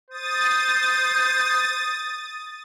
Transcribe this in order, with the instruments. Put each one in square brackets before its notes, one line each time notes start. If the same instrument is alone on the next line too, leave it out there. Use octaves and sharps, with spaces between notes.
[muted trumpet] C5 [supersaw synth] D#6 A6